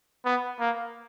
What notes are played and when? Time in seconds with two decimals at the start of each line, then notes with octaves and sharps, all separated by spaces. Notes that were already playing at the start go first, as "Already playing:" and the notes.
0.25 B3
0.60 A#3